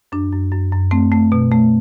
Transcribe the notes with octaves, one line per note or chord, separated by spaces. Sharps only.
F#2 D4
F#2
F#2
F#2
A3 C4
A3
B2
A3